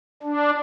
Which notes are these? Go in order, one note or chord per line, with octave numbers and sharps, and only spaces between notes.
D4